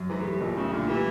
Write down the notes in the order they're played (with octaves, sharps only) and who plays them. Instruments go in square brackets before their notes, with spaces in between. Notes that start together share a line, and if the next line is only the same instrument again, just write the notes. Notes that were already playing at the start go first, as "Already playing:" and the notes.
Already playing: [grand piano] F#2
[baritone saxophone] G#2 [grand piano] E3
[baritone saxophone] A2
[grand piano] G3
[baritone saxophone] A2
[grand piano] B1 [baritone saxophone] A#2
[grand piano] A2 [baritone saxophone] C#3
[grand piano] A#2 [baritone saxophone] D3
[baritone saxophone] E3 [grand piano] G3